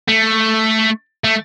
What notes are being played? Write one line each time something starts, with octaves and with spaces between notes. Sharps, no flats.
A3
A3